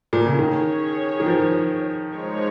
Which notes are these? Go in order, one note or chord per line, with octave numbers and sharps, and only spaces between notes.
A#2
C#3
D#3 C#4 G#4 C#5
D#3
F3
F3 G#3 D#4 C#5